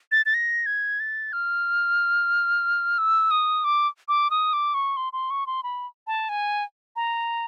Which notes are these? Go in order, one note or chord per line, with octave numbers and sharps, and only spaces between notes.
A6
A6
A#6
G#6
A6
F6
E6
D#6
D6
D6
D#6
D6
C#6
C6
C6
C#6
C6
B5
A5
G#5
A#5